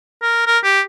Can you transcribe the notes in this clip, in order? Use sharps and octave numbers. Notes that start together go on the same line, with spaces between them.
A#4
A#4
G4